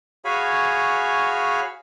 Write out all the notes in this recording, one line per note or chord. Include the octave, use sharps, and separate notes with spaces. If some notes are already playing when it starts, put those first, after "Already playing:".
F#4 G#4 C#5 F5 G#5 B5